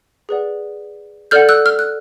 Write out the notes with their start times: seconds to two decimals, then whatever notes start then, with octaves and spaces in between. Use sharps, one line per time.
0.29 G#4 B4 D5 F#5
1.31 A4 D5 F#5 F6 G6
1.49 E6 F#6
1.66 F6
1.79 F#6